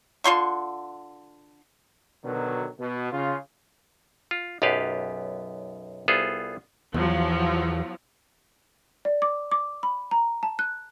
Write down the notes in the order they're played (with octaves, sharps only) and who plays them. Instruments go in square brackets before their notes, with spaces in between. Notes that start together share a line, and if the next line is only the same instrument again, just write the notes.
[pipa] D3 F4 C6 C#6
[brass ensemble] B2 D3 D#3 F#3
B2
C#3 F4
[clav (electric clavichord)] F4
B1 F#2 B3 G4 B4 F5
C2 B3 F4 G#4 A4
[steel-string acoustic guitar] E2 [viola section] F3 F#3
[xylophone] D5
D6
D6
B5
A#5
A5
F#6